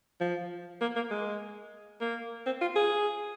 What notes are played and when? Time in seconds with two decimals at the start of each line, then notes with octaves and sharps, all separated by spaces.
0.21 F3
0.81 A#3
0.96 A#3
1.11 G#3
2.01 A#3
2.46 C4
2.61 F4
2.76 G#4